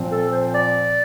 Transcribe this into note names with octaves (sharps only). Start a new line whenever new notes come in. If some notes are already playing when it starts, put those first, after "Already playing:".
Already playing: A#2 F3 C4
A4
C5
D5